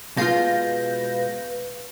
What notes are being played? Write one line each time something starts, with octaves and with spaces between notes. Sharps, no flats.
B2 G#3 F4 B4 F5 G6 A#6